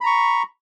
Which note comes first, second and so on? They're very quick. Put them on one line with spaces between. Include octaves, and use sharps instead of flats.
B5 A#5 C#6